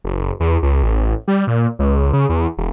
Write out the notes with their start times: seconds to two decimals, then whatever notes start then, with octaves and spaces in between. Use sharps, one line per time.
0.04 F#1
0.40 E2
0.63 C#2
0.83 A1
1.28 G3
1.47 A#2
1.79 C#2
2.13 C#3
2.29 E2
2.58 E1